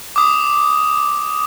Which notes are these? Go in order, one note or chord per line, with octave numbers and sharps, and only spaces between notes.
D6 D#6